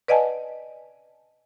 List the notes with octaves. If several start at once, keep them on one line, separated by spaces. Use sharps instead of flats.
B4 D5 D#5 F#5 G#5 A5